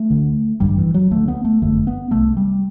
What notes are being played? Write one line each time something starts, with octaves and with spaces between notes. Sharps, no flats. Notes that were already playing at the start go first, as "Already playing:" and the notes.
Already playing: A3
D2 D3
A1 G2 D3 G3
E3
F#3
D2 D3 A3
B3
A3
G1 F#2 D3 A3
B3
C2 C3 A3
G3